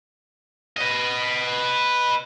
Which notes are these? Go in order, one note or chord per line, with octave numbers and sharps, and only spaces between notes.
B4 D#5